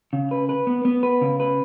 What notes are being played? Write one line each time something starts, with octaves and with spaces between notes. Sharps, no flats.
C#3
B4
B4
B3
B3
B4
C#3
B4